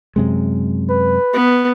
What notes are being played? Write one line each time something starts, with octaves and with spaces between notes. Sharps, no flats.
F#2 C3 G#3
B4
B3